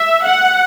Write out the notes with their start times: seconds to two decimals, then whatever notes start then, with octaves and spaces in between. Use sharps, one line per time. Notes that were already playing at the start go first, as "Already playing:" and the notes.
Already playing: E5
0.23 F#5